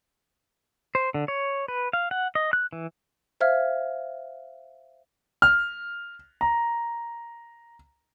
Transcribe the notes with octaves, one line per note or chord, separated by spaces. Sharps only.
C5
D3
C#5
B4
F5
F#5
D#5
F#6
E3
C5 E5 F5 F6 G#6
F6
A#5